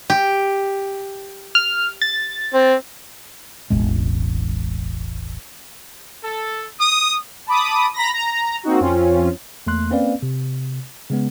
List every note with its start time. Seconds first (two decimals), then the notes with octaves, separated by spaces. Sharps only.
0.10 G4
1.55 F6
2.02 A6
2.54 C4
3.70 E1 A1 G#3
6.22 A4
6.79 D#6
7.47 A5 B5 D6 D#6
7.94 A#5 B5 A#6
8.14 A#5
8.63 A#3 C4 D#4 F#4
8.80 F2 C4 C#4 F4
9.67 E2 A3 A#3 C6 F#6
9.91 A#3 C4 C#4 B4 D5 F5
10.22 C3
11.10 C#3 G#3 B3